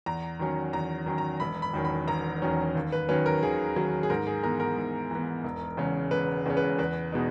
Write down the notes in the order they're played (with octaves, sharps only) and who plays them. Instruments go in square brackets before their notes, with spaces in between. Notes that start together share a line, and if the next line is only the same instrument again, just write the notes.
[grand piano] E2 A#5
D#3 F#3 C#4
E2 A#5
D#3 F#3 C#4
A#5
E1 B5
B5
E2 D#3 F#3 C#4
B5
E1 A#5
E2 D#3 F#3 C#4
D#2
B4
D#3 F#3 C#4 B4
A#4
D#2 G#4
D#3 F#3 C#4
G#4
G#2 A#4
G#4
E3 B3 A#4
A#4
G#2
E3 B3
E1
E2 C#3 G#3 C#4
E1 B4
E2 C#3 G#3 C#4
B4
E2 B4
B2 G#3 B3 D#4